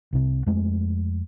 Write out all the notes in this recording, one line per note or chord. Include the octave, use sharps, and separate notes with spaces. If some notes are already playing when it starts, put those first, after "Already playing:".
C2 C3
F2 G#3 A3